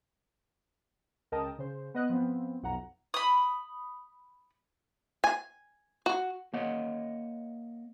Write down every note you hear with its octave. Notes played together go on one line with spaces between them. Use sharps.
C#2 A#4 D#5 G5 A5 D#6
C#3 C5
B3 D#5 F#6
F3 B3 C4
B1 F2 F#5 A#5
B5 D#6
G#5
F#4
A#3 C#5 D#5 F#5